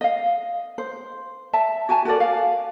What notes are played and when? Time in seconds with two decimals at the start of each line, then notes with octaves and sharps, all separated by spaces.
0.01 D#5 F5
0.78 C5
1.53 E5 A5
1.89 F#4 G#5 A5
2.05 F#4 A4 A#4 D5
2.20 F5